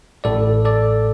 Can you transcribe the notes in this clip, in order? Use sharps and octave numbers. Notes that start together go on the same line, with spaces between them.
A1 A2 A4 D5
A4 D5